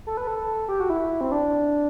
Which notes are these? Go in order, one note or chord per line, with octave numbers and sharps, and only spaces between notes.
A4
B4
A4
G4
F#4
E4
C4
D4